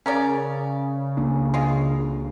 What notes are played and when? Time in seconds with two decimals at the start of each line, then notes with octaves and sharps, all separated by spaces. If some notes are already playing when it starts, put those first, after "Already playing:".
0.06 C#3 C#4 A#4 D5
1.17 C#2 A#3 D4
1.54 G#3 F4